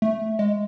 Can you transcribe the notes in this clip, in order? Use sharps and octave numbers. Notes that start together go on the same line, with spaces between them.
A3
G#3